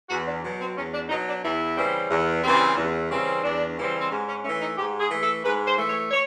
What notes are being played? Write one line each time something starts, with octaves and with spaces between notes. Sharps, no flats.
E2 F#4
D4
B2 F#3
C4
E2 C#4
D4
B2 F#3 D#4
D4
E2 E4
C#3 E3 G3 C4
E2
C#3 E3 G3 C4
E2
C#3 E3 G3 C4
E2 D4
C#3 E3 G3 C4
C4
G#2 C#4
C#4
E3 A3 C#4
D#4
G#2 G4
G#4
E3 A3
A4
G#2 B4
C5
E3 A3
C#5
C#5